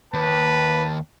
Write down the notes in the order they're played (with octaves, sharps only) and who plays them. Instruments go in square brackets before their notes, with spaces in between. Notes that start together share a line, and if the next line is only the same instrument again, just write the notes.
[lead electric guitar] D#2 [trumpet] B4 [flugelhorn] A5